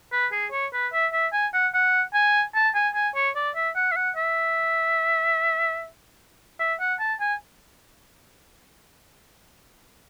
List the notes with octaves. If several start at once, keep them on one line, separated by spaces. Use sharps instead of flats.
B4
G#4
C#5
B4
E5
E5
G#5
F#5
F#5
G#5
A5
G#5
G#5
C#5
D5
E5
F#5
E5
F#5
E5
E5
F#5
A5
G#5